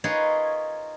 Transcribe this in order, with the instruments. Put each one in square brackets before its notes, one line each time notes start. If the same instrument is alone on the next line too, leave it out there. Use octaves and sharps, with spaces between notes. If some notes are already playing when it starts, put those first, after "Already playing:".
[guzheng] D#4 F4 G#4 A#4 B4 C#5